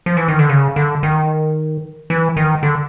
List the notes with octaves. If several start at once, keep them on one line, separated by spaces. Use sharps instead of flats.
F3
E3
D#3
D3
C#3
D3
D#3
E3
D#3
D3